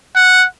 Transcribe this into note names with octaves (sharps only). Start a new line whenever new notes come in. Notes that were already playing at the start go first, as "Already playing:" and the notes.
F#5